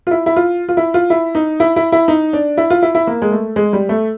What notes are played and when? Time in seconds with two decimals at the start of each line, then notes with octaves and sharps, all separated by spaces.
0.07 F4
0.11 E4
0.26 E4
0.36 F4
0.69 F4
0.77 E4
0.94 F4
1.10 E4
1.35 D#4
1.60 E4
1.76 E4
1.92 E4
2.08 D#4
2.33 D4
2.57 E4
2.70 F4
2.82 E4
2.95 E4
3.07 A#3
3.22 G#3
3.32 A3
3.56 G#3
3.73 G3
3.89 A3